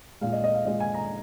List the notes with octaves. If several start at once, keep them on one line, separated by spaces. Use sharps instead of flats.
A#2 G#3 F5
D#5
D#5
F5
A#2 G#3 D#5
G#5
A#5